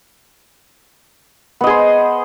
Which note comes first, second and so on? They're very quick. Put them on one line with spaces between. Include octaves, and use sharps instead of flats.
B3 D#5 G#4 C5